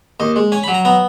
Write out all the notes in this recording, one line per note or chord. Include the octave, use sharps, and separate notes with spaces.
D#2 D#5
G#3
C#4 G#5
B5
F#3
A#5
B3 A#5